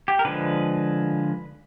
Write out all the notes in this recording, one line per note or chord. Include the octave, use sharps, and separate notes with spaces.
G4
A#4
D3 F3 G#3 B4